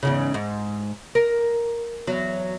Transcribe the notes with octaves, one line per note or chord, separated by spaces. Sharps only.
E2 G#2 C#3
G#2
A#4
E2 F#3